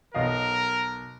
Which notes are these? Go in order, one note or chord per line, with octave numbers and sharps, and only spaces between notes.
B1 A#4 D#5 F5